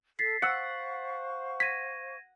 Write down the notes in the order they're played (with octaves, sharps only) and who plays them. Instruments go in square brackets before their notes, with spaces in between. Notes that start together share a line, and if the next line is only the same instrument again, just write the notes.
[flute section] A4 [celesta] A6 B6 C7
[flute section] C5 F5 C#6 [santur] F#5 [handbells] E6 C#7
[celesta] G#6 A#6 D#7 [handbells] B6